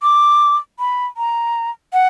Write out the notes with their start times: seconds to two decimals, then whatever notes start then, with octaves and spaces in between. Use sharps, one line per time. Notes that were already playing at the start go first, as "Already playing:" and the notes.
0.03 D6
0.79 B5
1.17 A#5
1.93 F#5